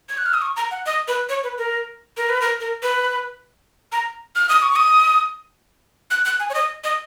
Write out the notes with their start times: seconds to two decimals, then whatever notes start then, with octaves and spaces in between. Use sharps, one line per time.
0.09 G#6
0.18 F#6
0.26 F6
0.34 D#6
0.42 C#6
0.56 A#5
0.71 F#5
0.86 D#5
1.08 B4
1.29 C#5
1.43 B4
1.58 A#4
2.17 A#4
2.29 B4
2.42 A#4
2.60 A#4
2.83 B4
3.92 A#5
4.36 F6
4.49 D#6
4.62 C#6
4.76 D#6
6.11 F#6
6.25 F#6
6.40 G#5
6.50 C#5
6.54 D#5
6.84 D#5